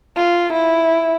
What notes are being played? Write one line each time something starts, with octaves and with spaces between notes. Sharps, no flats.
F4
E4